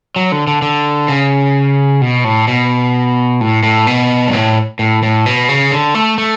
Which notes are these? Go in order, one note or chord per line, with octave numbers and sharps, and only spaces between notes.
F#3
D3
D3
D3
C#3
B2
A2
B2
A2
A2
B2
G2
A2
A2
A2
B2
C#3
D3
A3
A3